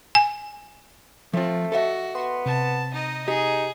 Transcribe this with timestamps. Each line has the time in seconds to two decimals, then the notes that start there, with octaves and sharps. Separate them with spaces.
0.15 G#5
1.33 F3 A3 C4 F4
1.72 F#4 A4 D#5 E5
2.15 B3 C6
2.46 C3 A5
2.93 D#4 D#5
3.28 D#4 G4 G#4